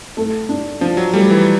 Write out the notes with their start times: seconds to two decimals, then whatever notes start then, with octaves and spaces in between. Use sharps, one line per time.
0.17 A3
0.49 D4
0.81 F3 D4
0.97 F#3
1.13 G3 A3
1.30 E3